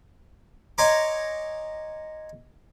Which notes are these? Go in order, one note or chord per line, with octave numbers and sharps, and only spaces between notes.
C#5 D#5 G#5 A#5 C6 D6